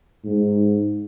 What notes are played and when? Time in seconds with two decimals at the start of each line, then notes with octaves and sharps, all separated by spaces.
0.24 G#2